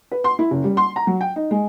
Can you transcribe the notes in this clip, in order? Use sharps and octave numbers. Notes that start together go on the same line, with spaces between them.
B4
C6
E4
F#1
G3
C6
A#5
F#3
G5
D#4
G#3